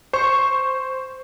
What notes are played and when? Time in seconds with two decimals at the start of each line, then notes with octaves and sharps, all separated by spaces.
0.13 C5 C#6